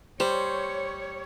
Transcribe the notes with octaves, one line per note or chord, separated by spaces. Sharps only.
G3 C5 C#5